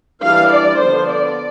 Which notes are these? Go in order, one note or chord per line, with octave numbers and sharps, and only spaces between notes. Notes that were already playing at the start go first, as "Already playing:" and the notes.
E3 G3 D4 F5
D5
D3 F3 B3 D4 C5
D5